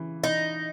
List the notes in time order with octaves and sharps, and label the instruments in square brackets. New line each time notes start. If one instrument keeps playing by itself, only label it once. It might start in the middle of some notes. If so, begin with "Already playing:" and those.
Already playing: [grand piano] C#3 E3
[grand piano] E3 [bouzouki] D#4